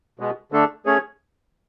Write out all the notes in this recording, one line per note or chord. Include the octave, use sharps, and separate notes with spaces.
B2 G#3 B3
D3 A3 D4 A4
A3 C#4 G#4 C#5